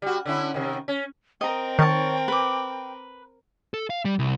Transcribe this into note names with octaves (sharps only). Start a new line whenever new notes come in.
G3 F#4
D3 C#4 E4
C3 D#3
C#4
C4 A#4 D#5 G5 A#5
D#3 C#5 A5
B4 D6
A4
F5
G3
C2